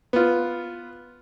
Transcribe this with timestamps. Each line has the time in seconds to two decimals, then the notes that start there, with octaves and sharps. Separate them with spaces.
0.13 B3 F4